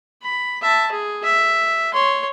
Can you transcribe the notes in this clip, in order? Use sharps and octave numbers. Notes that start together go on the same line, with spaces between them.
B5
E5 A5
G#4
E5
C#5 C6